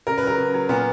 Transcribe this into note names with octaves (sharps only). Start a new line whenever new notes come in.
C#3 A#4
B4
F#3 A#4
C#3
F#3
A#2 B3